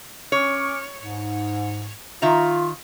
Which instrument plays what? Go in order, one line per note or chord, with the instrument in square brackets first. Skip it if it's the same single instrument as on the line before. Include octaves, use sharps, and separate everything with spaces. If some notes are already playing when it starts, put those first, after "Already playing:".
[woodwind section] C#4 D6 F6 [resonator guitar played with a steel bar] C#5
[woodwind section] G#2
[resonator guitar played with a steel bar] D#3 E5 A#5 [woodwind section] F4